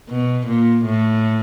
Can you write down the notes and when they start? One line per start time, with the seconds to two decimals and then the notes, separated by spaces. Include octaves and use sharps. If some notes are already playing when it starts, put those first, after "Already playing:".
0.09 B2
0.47 A#2
0.85 A2